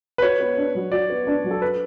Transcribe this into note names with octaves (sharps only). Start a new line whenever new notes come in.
B4
F#4 C#5
B3
D4
F#3
F#4 D5
B3
D4
F#3
A4
B4